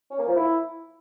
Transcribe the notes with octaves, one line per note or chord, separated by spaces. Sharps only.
C#4
A#3
F3
E4